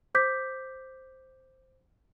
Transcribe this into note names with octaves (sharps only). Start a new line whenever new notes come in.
C5 D6 G6 B6